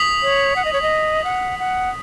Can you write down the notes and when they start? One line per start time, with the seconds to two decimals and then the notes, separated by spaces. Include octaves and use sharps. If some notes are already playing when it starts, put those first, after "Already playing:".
Already playing: D#6 B6 F#7
0.23 C#5
0.56 F#5
0.65 D#5
0.73 C#5
0.82 D#5
1.24 F#5
1.59 F#5